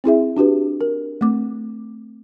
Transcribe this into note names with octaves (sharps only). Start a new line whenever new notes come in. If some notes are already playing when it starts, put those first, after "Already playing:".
C4 E4 G#4 E5
D4 F#4 G4 B4
A#4
A3 C4 D6